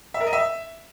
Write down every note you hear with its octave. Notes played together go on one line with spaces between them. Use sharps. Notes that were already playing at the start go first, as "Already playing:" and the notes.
E5
A#4
D#5
E5